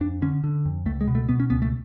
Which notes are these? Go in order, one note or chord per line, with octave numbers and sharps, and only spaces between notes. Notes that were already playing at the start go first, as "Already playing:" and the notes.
F2 D4
D3 C#4
D3
F2
C#2 A3
G#3
B2
A3
B2 B3
C#4
C#2 B3
A3